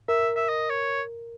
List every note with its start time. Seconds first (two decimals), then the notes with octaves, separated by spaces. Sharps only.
0.08 A#4 E5
0.36 E5
0.49 D#5
0.70 C#5